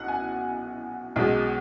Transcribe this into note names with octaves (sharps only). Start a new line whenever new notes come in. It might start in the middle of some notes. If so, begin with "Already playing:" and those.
Already playing: B1 B2 F#5
G#5
B1 B2 G#3